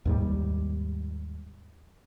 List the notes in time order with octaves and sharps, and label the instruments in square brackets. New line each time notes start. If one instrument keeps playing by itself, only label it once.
[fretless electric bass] D#2 G#2 G3